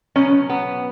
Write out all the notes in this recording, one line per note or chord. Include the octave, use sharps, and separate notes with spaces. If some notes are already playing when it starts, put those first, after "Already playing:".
B2 F#3 C#4
B3